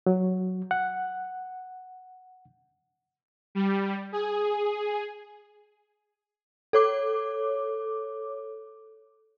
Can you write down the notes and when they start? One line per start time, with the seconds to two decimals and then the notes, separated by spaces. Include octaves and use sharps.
0.06 F#3
0.71 F#5
3.55 G3
4.12 G#4
6.73 A4 C#5 D6